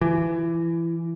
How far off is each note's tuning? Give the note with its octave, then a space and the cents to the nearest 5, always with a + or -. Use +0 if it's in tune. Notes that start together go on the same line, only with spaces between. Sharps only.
E3 +20